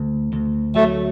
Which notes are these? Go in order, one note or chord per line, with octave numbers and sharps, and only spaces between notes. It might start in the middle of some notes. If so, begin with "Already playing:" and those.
Already playing: D2
D2
F#3 A3